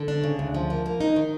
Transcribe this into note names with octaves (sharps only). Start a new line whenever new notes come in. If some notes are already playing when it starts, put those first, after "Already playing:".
Already playing: D3
D4
C#3
D2
F3
A#3
A#3
D#4
D#3